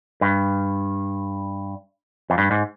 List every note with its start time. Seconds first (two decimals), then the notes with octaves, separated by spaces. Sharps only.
0.21 G2
2.30 F2
2.38 G2
2.51 G#2